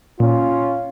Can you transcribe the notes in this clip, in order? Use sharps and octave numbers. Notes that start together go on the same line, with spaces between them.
A#2 C#4 F4